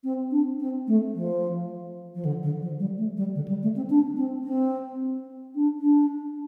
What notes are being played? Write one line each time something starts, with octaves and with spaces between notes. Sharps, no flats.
C4
D4
C4
A3
F3
F3
D3
D3
F3
G3
A3
G3
D3
G3
A3
C4
D4
C4
C4
D4
D4